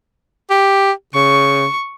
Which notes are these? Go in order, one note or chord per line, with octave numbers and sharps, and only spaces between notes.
G4
C#3 C#6